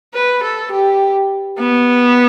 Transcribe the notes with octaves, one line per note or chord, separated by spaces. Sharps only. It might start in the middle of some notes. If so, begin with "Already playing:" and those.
B4
A4
G4
B3